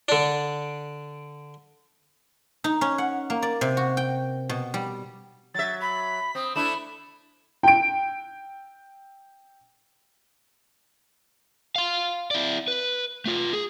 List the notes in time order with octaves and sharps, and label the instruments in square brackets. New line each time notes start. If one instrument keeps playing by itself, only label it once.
[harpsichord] D3 D4
[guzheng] D#4
C#4
F#5
A#3
D5
C3
F#4
G5
B2
G3
[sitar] F#3 E5 [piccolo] A6
[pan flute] B5 [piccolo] B6
[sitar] C4 [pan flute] D#6
[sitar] A3 D4 E4 [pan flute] B5 [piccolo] E7
[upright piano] G5 D7
[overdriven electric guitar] F5 C6
E4 D5
B4
A3 F4
G#4